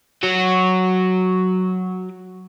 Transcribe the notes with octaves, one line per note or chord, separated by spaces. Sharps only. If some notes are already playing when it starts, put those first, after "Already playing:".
F#3 F#4